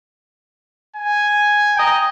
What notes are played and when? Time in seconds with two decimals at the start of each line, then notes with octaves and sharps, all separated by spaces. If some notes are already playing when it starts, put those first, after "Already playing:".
0.96 G#5
1.76 D#5 G5 A#5